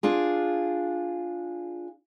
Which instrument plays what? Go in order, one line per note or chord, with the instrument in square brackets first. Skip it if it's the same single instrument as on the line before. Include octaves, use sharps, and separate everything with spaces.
[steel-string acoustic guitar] D4 F4 G#4